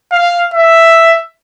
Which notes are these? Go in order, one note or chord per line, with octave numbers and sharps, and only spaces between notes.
F5
E5